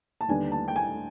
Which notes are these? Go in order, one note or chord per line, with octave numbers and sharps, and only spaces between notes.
A5
D#2 D3 G3 B3 D4 G#5
A5
G5
G#5